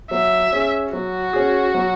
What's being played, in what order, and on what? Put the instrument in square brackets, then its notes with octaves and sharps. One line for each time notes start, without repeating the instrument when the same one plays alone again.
[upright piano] F#3 [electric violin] E5
[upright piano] C#4 G#4
[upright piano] F#3 [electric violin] F#4
[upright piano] C#4 G#4
F#3